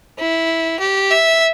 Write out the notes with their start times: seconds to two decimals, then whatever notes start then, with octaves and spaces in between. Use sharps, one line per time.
0.18 E4
0.80 G4
1.11 E5